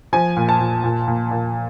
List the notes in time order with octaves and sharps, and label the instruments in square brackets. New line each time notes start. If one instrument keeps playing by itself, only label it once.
[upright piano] F3 G#5
A#2
A5
A#2
A#2
A#2
A#2